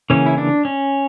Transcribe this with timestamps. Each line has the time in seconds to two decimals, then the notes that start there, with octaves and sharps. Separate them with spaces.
0.10 C#3 E3 A#3 C#4
0.26 E4
0.38 D4
0.65 C#4